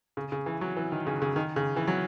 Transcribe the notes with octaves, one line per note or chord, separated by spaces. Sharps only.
C#3
C#3
E3
F#3
E3
D#3
C#3
C#3
D#3
C#3
E3
F#3